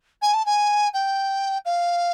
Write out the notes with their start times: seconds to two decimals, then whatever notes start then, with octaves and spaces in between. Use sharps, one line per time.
0.22 G#5
0.34 A5
0.46 G#5
0.93 G5
1.65 F5